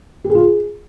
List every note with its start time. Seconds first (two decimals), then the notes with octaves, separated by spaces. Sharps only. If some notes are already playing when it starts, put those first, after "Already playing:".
0.24 G4
0.30 G#4
0.35 F4
0.40 G#4